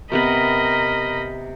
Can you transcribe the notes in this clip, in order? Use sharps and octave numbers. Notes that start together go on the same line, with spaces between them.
C3 B3 A#4 B4 D#5 B5